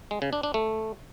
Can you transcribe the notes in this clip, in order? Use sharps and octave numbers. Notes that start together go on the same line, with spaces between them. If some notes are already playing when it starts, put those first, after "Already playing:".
G#3
C#3
D4
D4
A3